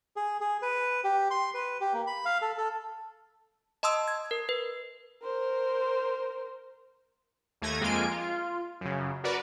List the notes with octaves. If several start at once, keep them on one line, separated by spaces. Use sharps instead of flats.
G#4
G#4
B4
G4
C6
B4
G4
A#3
B5
F5
A4
A4
D#5 A5 C6 D#6 E6
G#6
A#4
B4
A#4 C5
D#2 A3 G#6 A#6 D#7
F2 G#3 A#3 F4 G#5 D7
F4
F#2 C#3
F#4 A#4 B4 D5